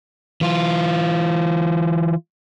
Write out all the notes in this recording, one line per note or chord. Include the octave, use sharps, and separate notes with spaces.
E3 F4